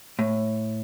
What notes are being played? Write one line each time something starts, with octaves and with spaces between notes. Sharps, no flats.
A2